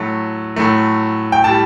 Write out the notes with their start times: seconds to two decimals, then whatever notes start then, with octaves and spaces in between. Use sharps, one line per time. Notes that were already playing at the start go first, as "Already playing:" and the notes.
Already playing: A2 F#3 A3
0.56 A2 F#3 A3
1.32 G5
1.44 A2 G3 A5